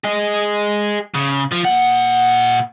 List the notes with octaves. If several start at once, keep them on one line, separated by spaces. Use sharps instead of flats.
G#4 D#5
C#3
F3
A#2 F#5